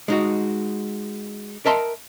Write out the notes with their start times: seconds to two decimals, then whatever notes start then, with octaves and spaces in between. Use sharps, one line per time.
0.08 G#3 D#4 F#4
1.65 A#4 D#5 E5 A5 A#5 C6